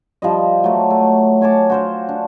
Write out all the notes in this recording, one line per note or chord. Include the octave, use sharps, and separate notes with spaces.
F3 G3 D#5
F#3 A3
A3
C#5 G#5 A5 D6
F#4 C5 F5
D4